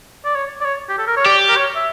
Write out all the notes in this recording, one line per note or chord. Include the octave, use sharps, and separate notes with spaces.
D5
C#5
D5
C#5
G4
A4
A#4
C#5
G4 D5
A#4
C#5
E5